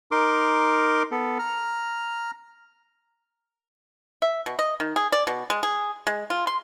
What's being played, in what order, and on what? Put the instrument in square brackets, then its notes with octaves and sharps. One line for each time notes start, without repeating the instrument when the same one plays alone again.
[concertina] D#4 A#4 C6 D6
B3 A4
A#5 F6
[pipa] E5
B2
D#5
D#3
G#4
D5
B2
G#3
G#4
G#3
F4
C6